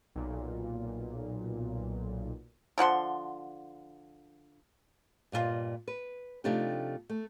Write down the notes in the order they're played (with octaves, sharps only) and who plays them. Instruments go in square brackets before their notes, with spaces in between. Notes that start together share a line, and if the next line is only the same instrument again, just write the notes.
[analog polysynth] B1 A#2
[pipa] D3 F3 F#5 C6
[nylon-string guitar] G2 A#2 G#3 F4 D#5
B4
C3 F3 A3 D4 D#4 G4
A3